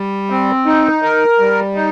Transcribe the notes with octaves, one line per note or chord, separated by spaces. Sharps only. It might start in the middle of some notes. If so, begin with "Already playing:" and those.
Already playing: G3
C4
D#4
A#4
G3
D#4